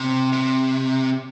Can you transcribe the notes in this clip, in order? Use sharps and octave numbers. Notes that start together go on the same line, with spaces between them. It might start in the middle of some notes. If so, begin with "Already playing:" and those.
Already playing: C3
C3